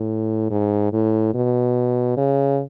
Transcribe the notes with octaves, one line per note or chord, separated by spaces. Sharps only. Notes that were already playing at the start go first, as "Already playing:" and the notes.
Already playing: A2
G#2
A2
B2
C#3